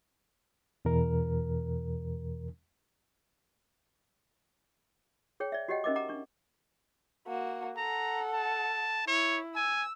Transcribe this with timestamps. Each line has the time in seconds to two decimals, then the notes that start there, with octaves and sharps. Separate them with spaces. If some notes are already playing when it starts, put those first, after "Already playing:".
0.85 E2 B2 E3 A#4
5.40 G#4 C#5 G5
5.52 D5 E5
5.68 F#4 G4 C#5 D#5 F#5 G5
5.84 C#4 D#4 A#4 D#5 E5 D6
5.96 F#5 A#5 D6
6.09 D4 C#6
7.27 A#3 F#4
7.77 A4 F#5 A#5
8.33 A5
9.07 E4 C#5
9.55 G#5 E6